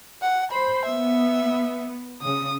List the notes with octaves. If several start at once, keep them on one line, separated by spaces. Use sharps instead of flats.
F#5
C5 B5
B3 E5
C#3 D#6